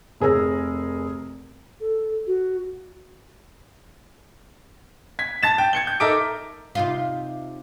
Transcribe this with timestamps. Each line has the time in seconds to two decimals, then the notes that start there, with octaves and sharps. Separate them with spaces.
0.20 F1 G#4 A#4 E6 A#6
1.80 A4
2.27 F#4
5.19 G#6 B6
5.43 A5 A6 E7
5.58 G5
5.73 G#6 C#7 G7
5.87 G6
6.00 D#4 A4 A#4 E5 D6 D7
6.75 C3 D#4 F4